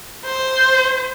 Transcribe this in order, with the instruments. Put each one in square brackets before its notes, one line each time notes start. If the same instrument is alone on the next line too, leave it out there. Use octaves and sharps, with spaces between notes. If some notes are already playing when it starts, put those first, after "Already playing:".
[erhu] C5